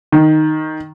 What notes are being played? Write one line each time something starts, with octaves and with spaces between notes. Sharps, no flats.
D#3